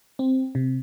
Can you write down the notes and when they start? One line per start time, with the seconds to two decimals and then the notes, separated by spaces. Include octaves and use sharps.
0.19 C4
0.55 C3